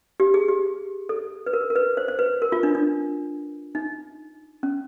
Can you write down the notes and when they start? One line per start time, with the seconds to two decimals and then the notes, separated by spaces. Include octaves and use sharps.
0.20 G4
0.34 G#4
0.48 G4
1.09 A4
1.46 B4
1.53 A#4
1.70 A#4
1.76 B4
1.97 C5
2.08 C5
2.19 B4
2.42 A#4
2.52 F4
2.63 D4
2.75 D4
3.75 D#4
4.63 C#4